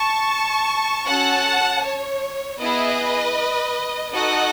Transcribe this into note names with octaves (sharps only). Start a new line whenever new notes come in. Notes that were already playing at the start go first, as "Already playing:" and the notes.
Already playing: A5 C#6
C#4 F#4 A4 F#5 A5
C#5
B3 E4 G#4 B4 D#5
D#4 F#4 A4 D#5 F#5